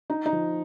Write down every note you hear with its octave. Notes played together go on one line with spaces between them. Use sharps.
D#4
D#4
F3